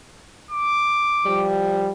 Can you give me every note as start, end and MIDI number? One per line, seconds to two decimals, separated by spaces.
0.51 1.48 86
1.25 1.89 53
1.25 1.89 55